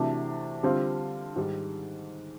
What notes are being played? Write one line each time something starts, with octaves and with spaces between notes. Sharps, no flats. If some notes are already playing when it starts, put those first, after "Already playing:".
Already playing: C3 E3 A3 D4 F#4
D3 G3 C4 F4
G#2 D#3 G3